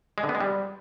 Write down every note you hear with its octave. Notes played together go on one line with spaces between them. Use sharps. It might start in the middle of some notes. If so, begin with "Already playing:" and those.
G#3
D3
B3
G#3
G3